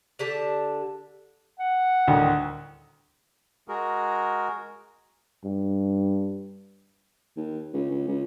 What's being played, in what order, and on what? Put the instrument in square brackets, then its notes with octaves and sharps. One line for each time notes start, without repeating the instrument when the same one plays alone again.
[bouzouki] D3 G4 A5
[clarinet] F#5
[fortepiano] D2 A2 D#3
[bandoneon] G#3 F#4 G#4 A#4
[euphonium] G2
[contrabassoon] D#2
C#2
C#2
C#2